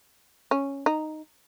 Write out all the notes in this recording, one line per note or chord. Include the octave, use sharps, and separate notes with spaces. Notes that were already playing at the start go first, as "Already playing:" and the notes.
C#4
D#4